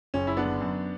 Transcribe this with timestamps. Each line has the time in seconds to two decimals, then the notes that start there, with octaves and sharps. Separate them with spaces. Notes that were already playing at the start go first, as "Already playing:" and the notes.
0.14 F#1 C#4
0.27 F#1 E4
0.37 B3 D4
0.45 D3
0.61 F#2